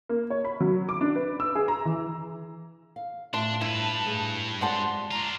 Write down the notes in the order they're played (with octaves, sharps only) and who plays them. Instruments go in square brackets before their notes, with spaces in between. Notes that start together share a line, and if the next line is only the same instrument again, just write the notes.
[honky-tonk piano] A#3
C#5
B5
F#3
D6
D4
B4
E6
G#4
A#5
E3
[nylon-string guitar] F5
[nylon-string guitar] A2 F4 E5 [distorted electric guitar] D4 [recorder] A5 [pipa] C6
[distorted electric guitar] G2 B4 [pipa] E4
[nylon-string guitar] A2 G#4
[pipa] C3 F#5 A5 [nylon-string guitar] G#3 F4 D5 [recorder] C6
[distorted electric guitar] D4 F4 [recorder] A#5